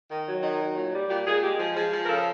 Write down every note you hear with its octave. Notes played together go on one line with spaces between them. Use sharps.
D#3
F#3
D#3 D#4
F#3
A#2
G3
A#2 G4
A#2 G#4
G#3 G4
F3 G#4
F3 G#4
F3
A#4
C#3 A4